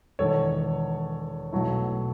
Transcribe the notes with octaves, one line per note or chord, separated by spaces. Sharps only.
E1 E2 D#3 A4 C#5
B1 B2 F#3 A3 E4